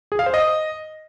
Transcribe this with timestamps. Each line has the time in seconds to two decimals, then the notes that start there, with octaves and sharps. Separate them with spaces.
0.12 G#4
0.19 F5
0.26 C5
0.34 D#5